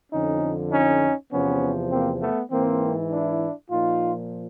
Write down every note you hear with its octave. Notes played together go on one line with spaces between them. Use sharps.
F2 D3 F3 C#4 D#4
C#4 D#4
E2 C3 F3 B3 C#4
A#3 C4
A3 B3
G#2 E3 A#3 C4
D4 E4
A#2 F3 D#4 F4